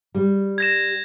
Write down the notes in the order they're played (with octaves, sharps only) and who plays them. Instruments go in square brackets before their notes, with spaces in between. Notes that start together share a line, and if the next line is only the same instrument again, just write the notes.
[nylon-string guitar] G3
[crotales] G#6 A#6 E7